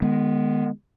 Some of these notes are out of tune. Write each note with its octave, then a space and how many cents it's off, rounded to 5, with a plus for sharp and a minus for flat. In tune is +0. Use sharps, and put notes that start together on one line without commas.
D#3 -35 G#3 +0 B3 -10